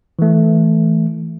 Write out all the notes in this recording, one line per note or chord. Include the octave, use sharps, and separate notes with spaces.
E3 A3